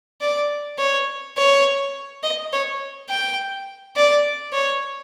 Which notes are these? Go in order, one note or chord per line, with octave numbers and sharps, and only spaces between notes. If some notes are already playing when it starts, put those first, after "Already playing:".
D5
C#5
C#5
D#5
C#5
G5
D5
C#5